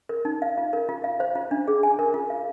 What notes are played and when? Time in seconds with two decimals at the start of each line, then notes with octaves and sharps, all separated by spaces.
0.09 A#4
0.25 D#4
0.42 F5
0.58 F4
0.73 A#4
0.89 F4
1.04 F5
1.20 C5
1.35 F4
1.51 D4
1.68 G#4
1.83 G#5
1.99 A#4
2.14 F4
2.30 F5